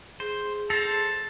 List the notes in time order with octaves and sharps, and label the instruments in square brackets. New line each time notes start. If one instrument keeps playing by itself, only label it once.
[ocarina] G#4 [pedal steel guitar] C5
[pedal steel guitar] A4 C5 [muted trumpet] A5 [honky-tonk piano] A#6 C7 F7